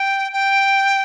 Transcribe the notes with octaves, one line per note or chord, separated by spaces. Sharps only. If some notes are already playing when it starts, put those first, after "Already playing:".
Already playing: G5
G5